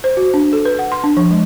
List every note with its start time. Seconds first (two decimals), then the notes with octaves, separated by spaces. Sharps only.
0.04 C5
0.17 F#4
0.34 D4
0.53 A4
0.65 B4
0.79 F#5
0.92 C6
1.04 D4
1.17 F3
1.31 G#3